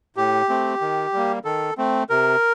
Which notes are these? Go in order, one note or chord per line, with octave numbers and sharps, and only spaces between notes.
A2 G4
A3 C4
D#3
G3 A#3
D#3 A4
A3 C4
C3 A#4